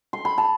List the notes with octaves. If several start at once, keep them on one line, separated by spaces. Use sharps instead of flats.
C6
B5
A5